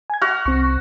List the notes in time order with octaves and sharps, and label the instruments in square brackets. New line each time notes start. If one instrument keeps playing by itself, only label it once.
[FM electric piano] G#5 G#6
[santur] F#4 [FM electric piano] F6
[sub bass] C2 [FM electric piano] C4 C#6